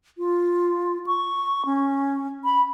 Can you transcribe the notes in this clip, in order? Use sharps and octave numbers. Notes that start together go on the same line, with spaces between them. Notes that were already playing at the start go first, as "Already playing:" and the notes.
F4
C#6
C#4
B5